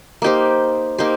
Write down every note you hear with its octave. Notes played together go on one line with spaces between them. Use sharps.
A#3 D#4 G4 C5
A#3 D#4 G4 C5